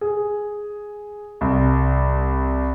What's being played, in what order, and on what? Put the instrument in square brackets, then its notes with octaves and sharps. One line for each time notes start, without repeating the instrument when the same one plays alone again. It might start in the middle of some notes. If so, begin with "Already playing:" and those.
[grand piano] G#4
C2